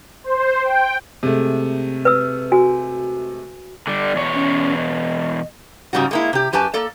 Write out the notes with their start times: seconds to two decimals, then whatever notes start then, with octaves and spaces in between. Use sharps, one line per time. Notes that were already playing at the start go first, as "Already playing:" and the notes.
0.24 C5
0.62 G5
1.23 C3 G#3 A3
2.05 B4 E6
2.52 F#4 G#5
3.87 D3 G3 D5
4.15 E2 B2 C#5
4.35 C#4
4.77 D#5
5.93 G#2 C#3 G3 C#4 F#4
6.11 G#3 A#3 E4
6.33 C3 G4
6.53 F#2 G4 B4 G#5 A5
6.74 A#3 A4 D5